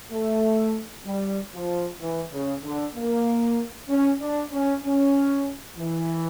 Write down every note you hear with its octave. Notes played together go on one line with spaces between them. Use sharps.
A3
G3
F3
E3
C#3
D3
A#3
C#4
D4
C#4
C#4
E3